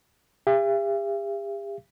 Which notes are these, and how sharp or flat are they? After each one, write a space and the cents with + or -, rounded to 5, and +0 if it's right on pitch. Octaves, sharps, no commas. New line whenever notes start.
G4 +45 E5 +45